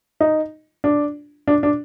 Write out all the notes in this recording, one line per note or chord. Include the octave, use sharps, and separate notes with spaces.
D#4
D4
D4
D4